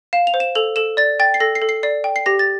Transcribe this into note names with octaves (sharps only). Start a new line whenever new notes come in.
F5 E7
F7
C5
E7
A4 F7
A4 E7
D5 A6
G5 A6
C7
A4 A#6
C7
A4
C7
D5 C7
G5
C7
G4 A#6
A6